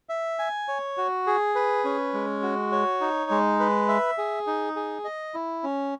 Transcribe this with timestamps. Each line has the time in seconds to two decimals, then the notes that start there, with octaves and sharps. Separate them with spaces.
0.09 E5
0.39 G#5
0.68 C#5
0.97 F#4
1.27 G#4
1.55 B4
1.85 C#4
2.14 G#3
2.42 F#4
2.72 C#5
3.01 D#4
3.31 G#3
3.60 B4
3.88 E5
4.18 G#4
4.47 D#4
4.76 G#4
5.04 D#5
5.34 E4
5.63 C#4